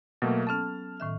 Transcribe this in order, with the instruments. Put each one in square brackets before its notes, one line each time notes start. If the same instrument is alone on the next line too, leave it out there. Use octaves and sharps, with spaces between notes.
[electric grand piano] B2 A3 A#3 [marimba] F#3
[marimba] B3 C#4 A4 [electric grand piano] A5 F6
[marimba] A2 D#3 E5